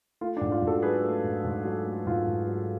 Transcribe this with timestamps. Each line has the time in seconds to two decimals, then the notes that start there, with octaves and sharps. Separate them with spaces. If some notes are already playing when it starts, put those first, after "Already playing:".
0.21 A3 F4
0.37 D4
0.41 G#2
0.52 F4
0.62 G#2
0.67 F#4 A4
0.82 F#3 G#4 B4
1.04 A3
1.24 G#2
1.45 G#2
1.65 F#3
1.85 A3
2.06 G#2 F4
2.27 G#2
2.47 F#3